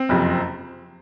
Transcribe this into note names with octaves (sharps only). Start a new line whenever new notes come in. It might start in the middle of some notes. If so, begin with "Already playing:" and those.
Already playing: C4
F#1 F2 C3